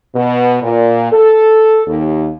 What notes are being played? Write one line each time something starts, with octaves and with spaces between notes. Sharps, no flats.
B2
A#2
A4
D#2